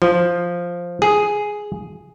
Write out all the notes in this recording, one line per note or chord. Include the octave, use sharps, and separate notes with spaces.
F3
G#4